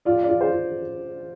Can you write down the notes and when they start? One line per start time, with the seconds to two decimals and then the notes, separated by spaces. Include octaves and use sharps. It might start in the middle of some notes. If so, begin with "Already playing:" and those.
0.05 F4 D5
0.23 D5
0.29 F4
0.41 C5
0.52 F4